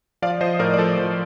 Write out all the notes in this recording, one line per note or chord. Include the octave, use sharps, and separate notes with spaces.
F3 D5 F5
F3 C5 D#5
A2 A#4 D5
D5
F3 A4 C5
F3